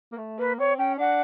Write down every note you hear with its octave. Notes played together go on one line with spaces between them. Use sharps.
A#3
A3
A#3 B4
C4 C#5
C#4 G5
D4 F#5